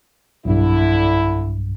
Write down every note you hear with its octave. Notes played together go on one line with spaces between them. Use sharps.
B1 G2 D3 E4